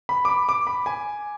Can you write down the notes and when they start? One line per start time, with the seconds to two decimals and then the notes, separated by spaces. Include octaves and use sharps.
0.09 B5
0.25 D6
0.28 B5
0.49 D6
0.67 B5
0.86 G#5